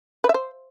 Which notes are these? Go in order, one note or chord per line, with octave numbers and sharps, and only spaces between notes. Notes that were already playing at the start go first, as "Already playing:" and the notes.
B4
E5
C5